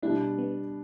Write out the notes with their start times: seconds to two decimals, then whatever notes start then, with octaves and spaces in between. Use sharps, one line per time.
0.02 B2 G3 D4 E4
0.38 B3